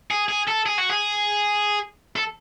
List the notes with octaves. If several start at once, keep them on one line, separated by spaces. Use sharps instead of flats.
G#4
G#4
A4
G#4
F#4
G#4
A4